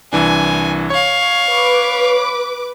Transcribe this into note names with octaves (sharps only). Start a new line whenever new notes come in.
C2 E3 D4 G#5
C#5 F5 C#6
B4 D6